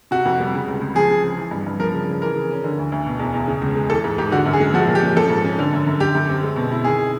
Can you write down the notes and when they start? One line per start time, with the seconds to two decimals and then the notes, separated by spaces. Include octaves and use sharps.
0.11 C3 F#4
0.25 F2
0.40 G3
0.54 C#3
0.68 C#2
0.81 C#2
0.95 F3 G#4
1.09 C#3
1.23 C4
1.38 E3
1.51 G2
1.66 G2
1.79 F3 A#4
1.94 C#3
2.08 C#3
2.22 E3 A#4
2.36 C#3
2.51 C#4
2.64 D3
2.77 D2
2.92 D2
3.06 B2
3.19 E2
3.34 E2
3.48 C#3
3.62 C#2
3.76 G#3
3.90 E3 A4
4.04 G#2
4.18 G#2 G4
4.32 D3 F#4
4.46 F#2
4.53 G#4
4.61 G#3
4.74 F3 F#4
4.88 A#2
4.95 G4
5.03 C#4
5.16 F3 A4
5.30 G#2
5.44 C#4
5.59 D3
5.73 F#2
5.87 F#2
6.00 D3 G4
6.15 F#2
6.29 C4
6.43 G#3
6.56 B2
6.71 E4
6.84 D#3 G#4